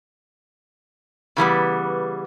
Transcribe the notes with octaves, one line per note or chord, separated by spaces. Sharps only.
C#3 E3 G3 B3